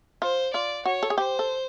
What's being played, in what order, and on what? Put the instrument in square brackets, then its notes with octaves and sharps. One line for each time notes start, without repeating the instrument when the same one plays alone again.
[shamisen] F4 [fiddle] C5
[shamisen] F4 [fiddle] D5
[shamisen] F#4 [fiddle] C#5
[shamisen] A4
G#4
[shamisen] G4 [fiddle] C5
[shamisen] A4